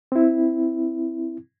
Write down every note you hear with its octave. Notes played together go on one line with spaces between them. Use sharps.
C4 E4